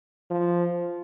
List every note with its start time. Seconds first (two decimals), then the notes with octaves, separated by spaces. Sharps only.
0.31 F3